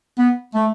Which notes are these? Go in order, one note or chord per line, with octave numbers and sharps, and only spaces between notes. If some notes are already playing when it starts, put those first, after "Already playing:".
B3
A3